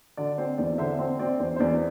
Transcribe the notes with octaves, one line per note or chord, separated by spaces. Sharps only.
D3 D5
C4 C5
E2 D5
D3 C5 E5
C4 C5
C4 D5
E2 C5
C5
E2 D5